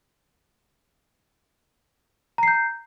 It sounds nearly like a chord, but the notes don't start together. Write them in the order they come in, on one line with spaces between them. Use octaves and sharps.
A#5 C7 G6